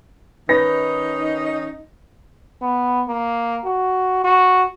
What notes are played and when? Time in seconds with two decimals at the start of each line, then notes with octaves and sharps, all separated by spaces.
0.49 D#3 C#4 D#4 B4 A#6
2.62 B3
3.08 A#3
3.65 F#4
4.24 F#4